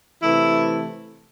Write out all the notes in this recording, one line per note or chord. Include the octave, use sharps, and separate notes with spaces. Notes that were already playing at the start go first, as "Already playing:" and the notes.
C3 E3 A3 E4